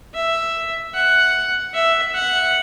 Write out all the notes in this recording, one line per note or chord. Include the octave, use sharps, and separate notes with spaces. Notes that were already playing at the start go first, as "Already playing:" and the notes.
E5
F#5
E5
F#5